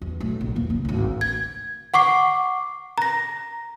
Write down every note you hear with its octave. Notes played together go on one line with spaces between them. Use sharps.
E2
B1 A3
A#1
E2 A#3
C#3
G#1 D2
G#6
F#5 C#6 D6 C7
A#5 A#6